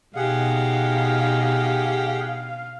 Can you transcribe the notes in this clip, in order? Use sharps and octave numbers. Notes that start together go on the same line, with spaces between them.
B2 D#4 G4 G#4 F5 F#5